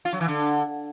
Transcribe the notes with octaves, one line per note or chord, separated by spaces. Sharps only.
F4
F#3
E3
D3